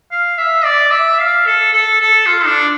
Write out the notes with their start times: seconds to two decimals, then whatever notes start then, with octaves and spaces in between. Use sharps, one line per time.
0.12 F5
0.38 E5
0.65 D5
0.92 E5
1.19 F5
1.47 A4
1.73 A4
2.00 A4
2.27 F4
2.46 D4